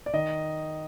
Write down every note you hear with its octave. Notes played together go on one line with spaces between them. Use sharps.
D5
D#3 D#5